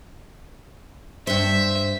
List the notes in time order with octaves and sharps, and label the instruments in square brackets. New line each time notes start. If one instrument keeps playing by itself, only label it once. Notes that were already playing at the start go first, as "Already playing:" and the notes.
[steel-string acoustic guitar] G2 C5 [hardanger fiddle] E5